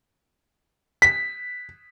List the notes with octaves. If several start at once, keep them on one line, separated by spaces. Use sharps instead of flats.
B6